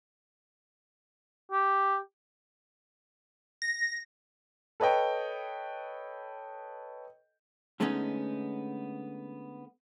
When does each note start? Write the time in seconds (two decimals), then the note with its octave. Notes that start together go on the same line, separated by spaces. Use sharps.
1.52 G4
3.62 A#6
4.80 A4 B4 C#5 D#5 G5
7.80 D3 G#3 A3 B3 C#4 D#4